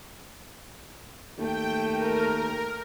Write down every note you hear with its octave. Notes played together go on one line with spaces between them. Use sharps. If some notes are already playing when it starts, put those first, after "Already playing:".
D#2 A3 G5
A#4